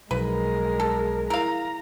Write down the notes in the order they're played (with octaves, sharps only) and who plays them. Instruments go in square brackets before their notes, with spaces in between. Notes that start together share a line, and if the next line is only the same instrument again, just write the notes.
[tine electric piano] B1 [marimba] F3 [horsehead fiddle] G#3 A#4 [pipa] B4
[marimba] G#4 [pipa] A4
[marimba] E4 [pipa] A#4 F5 [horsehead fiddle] A#5